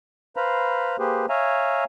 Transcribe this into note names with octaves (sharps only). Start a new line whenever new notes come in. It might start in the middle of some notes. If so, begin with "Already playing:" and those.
B4 C5 F5 A#5 B5
A#3 G4 G#4 B4 C5
C#5 E5 F5 G#5 A#5